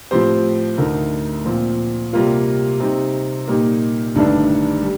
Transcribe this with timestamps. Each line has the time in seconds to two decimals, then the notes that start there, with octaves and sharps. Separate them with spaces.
0.11 A2 F3 C4 G4 C5
0.77 D2 D3 A3 D#4 A#4
1.45 A#2 F3 C4
2.13 C3 G3 A#3 F4
2.80 C3 G3 C4 D#4
3.47 A#2 G3 A#3 D#4 G4
4.15 G1 G2 D#3 A3 D4
4.82 G3